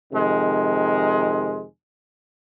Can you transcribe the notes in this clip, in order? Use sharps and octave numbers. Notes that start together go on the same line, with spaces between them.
F2 C3 D#3 G#3